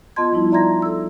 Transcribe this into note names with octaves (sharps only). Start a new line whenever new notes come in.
B3 F4 D#5 A5 C6 G#6
F3 G3 B3 D#4 E4
D5 E5 A#5 C6 G#6 A#6
A4 E6